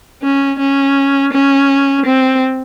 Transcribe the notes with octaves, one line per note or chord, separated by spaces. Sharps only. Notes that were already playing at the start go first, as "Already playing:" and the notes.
C#4
C#4
C#4
C4